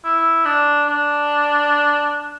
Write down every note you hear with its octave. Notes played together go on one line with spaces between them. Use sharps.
E4
D4
D4